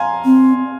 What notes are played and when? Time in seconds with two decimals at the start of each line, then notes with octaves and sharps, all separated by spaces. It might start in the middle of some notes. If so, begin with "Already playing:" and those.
Already playing: F5 G#5 A#5 C6
0.25 C4